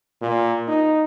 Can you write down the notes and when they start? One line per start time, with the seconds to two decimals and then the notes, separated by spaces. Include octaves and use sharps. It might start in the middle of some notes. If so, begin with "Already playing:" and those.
0.22 A#2
0.68 D#4